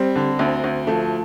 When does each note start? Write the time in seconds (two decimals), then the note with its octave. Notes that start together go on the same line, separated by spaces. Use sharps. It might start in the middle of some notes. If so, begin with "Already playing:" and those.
Already playing: G3 C4
0.15 D3
0.39 D2
0.64 D2
0.87 F3 A3